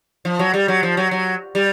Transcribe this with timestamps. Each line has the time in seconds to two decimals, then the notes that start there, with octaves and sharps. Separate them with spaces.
0.25 F3
0.39 F#3
0.54 G3
0.68 F#3
0.83 F3
0.97 F#3
1.11 F#3
1.55 G3